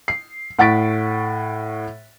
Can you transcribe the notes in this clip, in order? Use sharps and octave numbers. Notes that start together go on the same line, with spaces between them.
C7
A2 F#5 C#6 A6 B6 D7